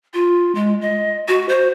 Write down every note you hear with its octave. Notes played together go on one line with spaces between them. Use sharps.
F4
G#3
D#5
F#4
C5